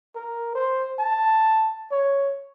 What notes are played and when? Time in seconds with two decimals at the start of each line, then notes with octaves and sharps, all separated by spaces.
0.15 A#4
0.55 C5
0.99 A5
1.91 C#5